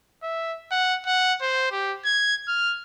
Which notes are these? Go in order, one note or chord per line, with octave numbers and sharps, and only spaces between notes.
E5
F#5
F#5
C5
G4
G#6
F6